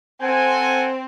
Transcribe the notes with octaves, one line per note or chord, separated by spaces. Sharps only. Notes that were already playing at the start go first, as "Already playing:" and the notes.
C4 A4 F#5 G#5